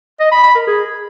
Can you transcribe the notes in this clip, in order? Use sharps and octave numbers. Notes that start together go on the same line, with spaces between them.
D#5
B5
B5
A#4
G#4